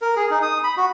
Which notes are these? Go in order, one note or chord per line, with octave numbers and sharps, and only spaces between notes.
A#4
G#4
D#4
D#6
B5
F#4